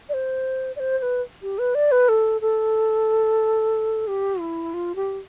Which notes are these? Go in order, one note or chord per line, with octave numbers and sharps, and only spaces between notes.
D5
C5
D5
C5
C5
B4
G4
B4
D5
B4
A4
A4
G4
E4
F4
G4